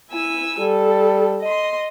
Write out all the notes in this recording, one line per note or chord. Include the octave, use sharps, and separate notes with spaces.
E4 G#5 E6
G3 A4
D#5 C6